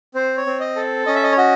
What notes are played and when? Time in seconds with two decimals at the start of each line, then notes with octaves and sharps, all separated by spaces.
0.14 C4 C5
0.37 C#5
0.46 C4
0.60 D#5
0.76 A4
1.06 C#4 D#5
1.15 E5
1.23 D#5
1.32 C#5
1.37 F#4 D#5